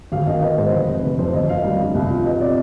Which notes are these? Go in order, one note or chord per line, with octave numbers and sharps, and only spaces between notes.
G#1 F5
D#3 D#5
B3 D#5
G#2 C5
F1 B4
C3
F1 B4
F2 C5
G#1 D#5
D#3 F5
G3
G2
C2
F3
B3 D#5
C3 D5